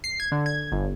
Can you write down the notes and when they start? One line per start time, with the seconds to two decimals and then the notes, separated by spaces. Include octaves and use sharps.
0.04 C7
0.20 G#6
0.32 D3
0.46 G#6
0.72 G1